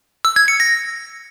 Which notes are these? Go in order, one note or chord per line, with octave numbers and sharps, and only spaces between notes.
E6
G#6
C#7
A#6